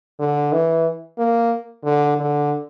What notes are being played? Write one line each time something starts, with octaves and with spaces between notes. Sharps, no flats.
D3
E3
A#3
D3
D3